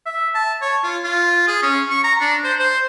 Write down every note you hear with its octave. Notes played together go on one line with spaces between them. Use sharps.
E5
A5
C#5
F4
F4
G#4
C#4
C#6
A#5
D4
C5
C5